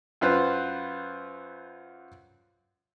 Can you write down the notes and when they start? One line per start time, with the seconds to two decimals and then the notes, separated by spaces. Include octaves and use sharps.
0.21 F#2 F4 B4 C5